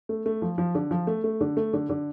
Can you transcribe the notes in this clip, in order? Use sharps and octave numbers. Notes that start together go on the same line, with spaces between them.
A3
A3
F3
F3
D3
F3
A3
A3
D3
A3
D3
D3